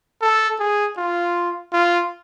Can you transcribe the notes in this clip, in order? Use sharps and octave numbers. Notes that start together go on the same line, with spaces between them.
A4
G#4
F4
F4